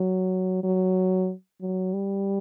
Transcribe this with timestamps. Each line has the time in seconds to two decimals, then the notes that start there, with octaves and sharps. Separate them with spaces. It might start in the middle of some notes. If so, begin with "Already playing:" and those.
Already playing: F#3
0.64 F#3
1.61 F#3
1.94 G3